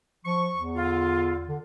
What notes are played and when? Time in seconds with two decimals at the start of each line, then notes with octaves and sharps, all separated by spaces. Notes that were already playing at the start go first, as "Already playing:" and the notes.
0.25 F3 C#6
0.56 E2
0.75 D3 F4
1.48 D3